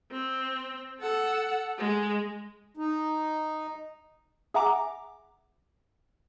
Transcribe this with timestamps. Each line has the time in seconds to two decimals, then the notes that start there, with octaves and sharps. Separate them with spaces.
0.12 C4
1.01 A4 F#5
1.78 G#3
2.77 D#4
4.54 G#4 E5 F#5 A#5 D6